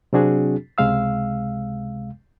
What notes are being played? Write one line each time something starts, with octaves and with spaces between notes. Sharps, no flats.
C3 F#3 C4 D4 F#4 G#4
C#2 C3 G#3 F5 E6